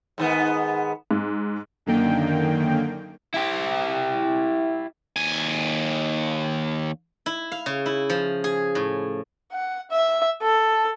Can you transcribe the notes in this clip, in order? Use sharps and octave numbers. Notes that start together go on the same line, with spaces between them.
G#2 D#3 B3
G#2
F#2 D3 D#3 A#3 G5
E4 G4
D#2 G#5
E4
F5
C#3
E4
F3
G#4
A2
F#5
E5
A4